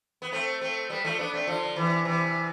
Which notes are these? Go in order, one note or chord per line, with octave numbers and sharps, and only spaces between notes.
B3
A3 C4
A3 C4
G3 B3
F3 A3
B3 D4
A3 C4
D3 F3
C3 E3
C3 E3